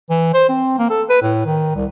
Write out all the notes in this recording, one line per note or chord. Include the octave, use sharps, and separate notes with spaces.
E3
C5
C4
A#3
A4
B4
A2
D#3
C2